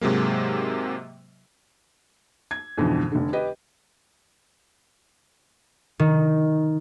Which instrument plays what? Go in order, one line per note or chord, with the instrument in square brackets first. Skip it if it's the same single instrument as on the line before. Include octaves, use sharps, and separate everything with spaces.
[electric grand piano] G#2 C3 F#3 G#3 A#3
[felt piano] G#6
F2 G#2 B2 D3 E3
F1 D3
G4 B4 D#5
[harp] D#3